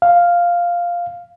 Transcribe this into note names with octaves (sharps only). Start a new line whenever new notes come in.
F5